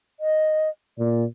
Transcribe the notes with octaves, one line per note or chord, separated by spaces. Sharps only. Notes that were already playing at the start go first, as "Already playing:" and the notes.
D#5
A#2 D5